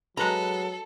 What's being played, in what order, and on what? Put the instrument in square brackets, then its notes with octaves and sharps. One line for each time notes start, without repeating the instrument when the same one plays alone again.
[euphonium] F#3 [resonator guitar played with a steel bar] G#3 B4 A#5 [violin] A4